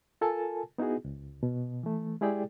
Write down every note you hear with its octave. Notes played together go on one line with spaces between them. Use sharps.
F4 A4 A#4 G#5 A5
B3 D#4 E4 F#4 G#4
C#2
B2
E3 A3
G#3 E4 G4 G#4 D5 G5